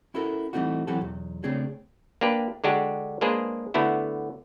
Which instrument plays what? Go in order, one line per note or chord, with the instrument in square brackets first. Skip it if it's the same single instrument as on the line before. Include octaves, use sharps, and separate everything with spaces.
[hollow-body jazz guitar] C#4 E4 F#4 A4 A#4
E3 G3 A3 C4 D#4 F#4
E3 F#3 C4 F#4 G4 A4
B1 E2
C#3 A3 C4 D4 G#4 C#5
[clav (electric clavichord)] A#3 D4 G4 B4
D3 G#3 D4 F#4 G4
G#3 A#3 D4 G#4 B4 C5
D3 A3 B3 E4 F#4